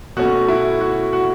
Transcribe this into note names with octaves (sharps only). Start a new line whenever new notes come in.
B2 A3 C#4 F#4
E4
F#4
F#4